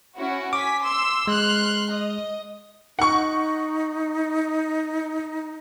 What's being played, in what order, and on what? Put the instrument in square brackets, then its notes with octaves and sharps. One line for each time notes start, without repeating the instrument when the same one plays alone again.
[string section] C#4 E4 F#4
[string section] G#5 B6 [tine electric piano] D6
[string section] C6 E6
[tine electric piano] G#3 [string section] C6 F6 F#6
[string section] D#5
[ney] D#4 [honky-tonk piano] F#5 C#6